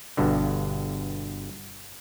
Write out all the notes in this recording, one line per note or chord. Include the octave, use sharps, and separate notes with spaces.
G1 G2 B2 D3